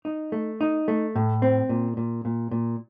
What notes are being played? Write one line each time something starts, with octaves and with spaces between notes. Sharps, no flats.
D#4
A3
D#4
A3
A2
C4
A#2
A#2
A#2
A#2